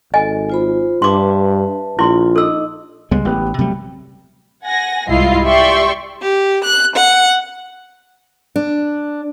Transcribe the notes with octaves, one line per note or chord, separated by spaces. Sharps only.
G#1 A4 D#5 G#5
F4 C5 B5
G2 B4 E5 A5 C6 D6
A#1 E4 F4 C6
D#4 A4 D#5 D6 E6
C#2 G3 G#3 B3
A1 B3 G4
C3 F#3 G3 A3
F#5 G#5 A#6
C2 G#2 E4 F4 D#5 C7
G4 D5 E5 G5 C6 C#6
G4
F#6
F#5
D4